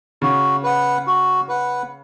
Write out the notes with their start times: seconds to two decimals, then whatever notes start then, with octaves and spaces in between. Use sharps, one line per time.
0.22 C#3 F#4
0.63 B4 F#5
1.07 F#4
1.48 B4 F#5